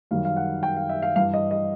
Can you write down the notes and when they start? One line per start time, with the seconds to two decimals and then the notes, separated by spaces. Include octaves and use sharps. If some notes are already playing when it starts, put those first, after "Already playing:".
0.11 F#2 D#3 G3 F5
0.25 F5
0.36 F#5
0.63 G5
0.77 F5
0.89 E5
1.02 F5
1.16 G2 E3 G3 F5
1.34 D#5
1.51 D#5